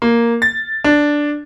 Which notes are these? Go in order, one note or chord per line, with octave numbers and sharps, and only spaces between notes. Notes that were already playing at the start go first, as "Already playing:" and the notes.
A#3
A6
D4